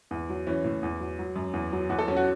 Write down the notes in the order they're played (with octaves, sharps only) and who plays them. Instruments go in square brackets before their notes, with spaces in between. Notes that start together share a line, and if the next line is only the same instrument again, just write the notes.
[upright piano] E2
F#3
E3 C#4
A2
E2
F#3
F#3
F#2
E2
F#3
E2 F#4
A4
F#3 C#4
F#4